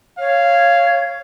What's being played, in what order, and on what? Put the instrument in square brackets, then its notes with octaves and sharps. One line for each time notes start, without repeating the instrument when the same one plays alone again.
[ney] C#5 [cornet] F5